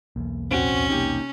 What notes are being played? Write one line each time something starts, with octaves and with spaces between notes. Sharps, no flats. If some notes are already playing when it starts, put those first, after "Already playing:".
B1 E2 A#3
D#2 A2 C4 C#4 F#4
C3 A#3 D#4 G4